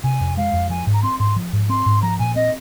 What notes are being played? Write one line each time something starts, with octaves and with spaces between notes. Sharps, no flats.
C3 G#5
F2
G#3 F5
F2
F3 G#5
G#2
A#5
C4 C6
G#2 C6
F3
G#2
C4 C6
G#2
F3 A#5
A#2 G#5
C4 D#5